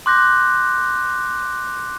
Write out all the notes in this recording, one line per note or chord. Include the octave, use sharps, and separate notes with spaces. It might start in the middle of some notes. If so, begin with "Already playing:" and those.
C6 D6 F#6 G6 A#6